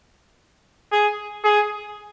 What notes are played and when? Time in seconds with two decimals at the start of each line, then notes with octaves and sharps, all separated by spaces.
0.92 G#4
1.44 G#4